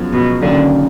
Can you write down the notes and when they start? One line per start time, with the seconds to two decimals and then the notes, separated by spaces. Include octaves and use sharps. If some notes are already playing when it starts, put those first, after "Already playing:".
Already playing: F#2 F3 G#3 B3
0.13 B2
0.42 F#1 F#2 D3 D#3 A#3